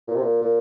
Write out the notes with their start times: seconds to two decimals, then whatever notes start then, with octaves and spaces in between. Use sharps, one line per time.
0.08 A#2
0.15 C3
0.22 A#2
0.42 A#2